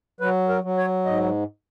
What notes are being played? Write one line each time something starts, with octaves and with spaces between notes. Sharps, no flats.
F#3 B4
A#4
F#3
C#5
G#2 D#5